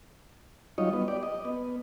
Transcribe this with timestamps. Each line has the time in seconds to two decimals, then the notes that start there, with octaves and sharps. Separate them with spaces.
0.78 F#3 G3 D#4 F4 C#5 D#5
0.93 B3
1.08 G4 D5
1.23 D#5
1.45 B3